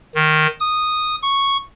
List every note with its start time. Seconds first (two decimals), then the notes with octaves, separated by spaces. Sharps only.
0.15 D#3
0.60 D#6
1.23 C#6